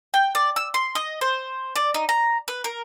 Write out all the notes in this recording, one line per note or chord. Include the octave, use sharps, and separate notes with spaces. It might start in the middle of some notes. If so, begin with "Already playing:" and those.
G5
D5
E6
C6
D#5
C5
D5
D#4
A#5
B4
A#4